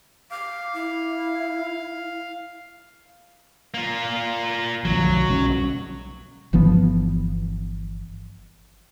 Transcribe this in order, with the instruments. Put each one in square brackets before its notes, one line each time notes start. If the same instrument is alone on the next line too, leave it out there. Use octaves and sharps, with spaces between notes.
[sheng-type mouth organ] F5 [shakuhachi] D6
[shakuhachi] E4
[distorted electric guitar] A#3 F4
[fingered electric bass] B1 D3 F3 [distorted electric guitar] F#3
[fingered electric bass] B1 G3 C#4
[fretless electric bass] G1 E3 F3 B3